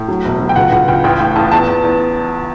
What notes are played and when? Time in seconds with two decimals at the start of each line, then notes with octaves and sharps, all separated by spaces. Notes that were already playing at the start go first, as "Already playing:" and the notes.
Already playing: A2
0.08 F#3
0.25 E1
0.40 F#3
0.49 G5
0.56 C#2 F#5
0.72 C#2 F#5
0.88 C#2 G5
1.04 A1 G5
1.19 A2 G5
1.36 A1 A5
1.51 E2 A5
1.68 E2
1.84 E2